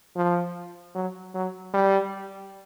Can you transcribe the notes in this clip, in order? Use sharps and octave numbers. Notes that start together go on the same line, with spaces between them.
F3
F#3
F#3
G3